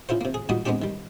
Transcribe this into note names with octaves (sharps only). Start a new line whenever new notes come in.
C#3 E4 F4 C5
C3 A#3
G#4
A#2 D#3 G3 F#4 D#6
G#3 B3 C4 D4 G4
D#3 G3